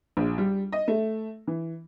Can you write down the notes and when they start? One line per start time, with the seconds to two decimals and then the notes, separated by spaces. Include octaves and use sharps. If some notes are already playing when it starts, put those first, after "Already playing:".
0.17 A#1
0.38 G3
0.72 D#5
0.88 A3
1.47 E3